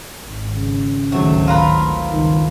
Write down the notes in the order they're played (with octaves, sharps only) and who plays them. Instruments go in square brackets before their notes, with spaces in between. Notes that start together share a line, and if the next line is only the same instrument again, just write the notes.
[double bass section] G#1
[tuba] C#3
[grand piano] G#1 F#3 [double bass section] D2 A2 D#3 [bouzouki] A3
[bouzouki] F4 A#4 B4
[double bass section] C#2 G2 [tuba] D#3